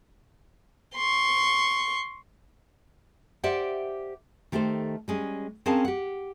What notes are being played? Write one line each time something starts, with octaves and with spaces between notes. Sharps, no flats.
C6 C#6
G4 C5 D5 E5 F#5
D#3 A3 G4 A4 C5
G3 G#3 C#4
C4 C#4 G#4 A#4 F5 A5
G4 F#5